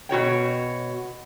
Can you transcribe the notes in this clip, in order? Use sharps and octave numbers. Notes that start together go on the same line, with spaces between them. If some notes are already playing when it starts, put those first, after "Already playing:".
B2 F#4 C#5 G5